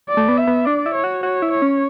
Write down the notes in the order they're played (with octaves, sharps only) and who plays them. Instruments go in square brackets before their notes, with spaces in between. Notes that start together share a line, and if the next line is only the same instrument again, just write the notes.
[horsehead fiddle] D5
[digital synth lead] A3
B3
[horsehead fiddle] E5
[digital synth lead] B3
[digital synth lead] D4 [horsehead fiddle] D5
[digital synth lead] E4
[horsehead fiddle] C#5
[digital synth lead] F#4
[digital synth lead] F#4 [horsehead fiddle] C#5
[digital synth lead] E4
[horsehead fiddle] C#5
[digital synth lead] C#4